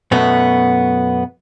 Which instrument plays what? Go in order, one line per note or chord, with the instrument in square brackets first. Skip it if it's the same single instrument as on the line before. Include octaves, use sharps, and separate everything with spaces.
[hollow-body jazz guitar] F#2 B2 A3 B3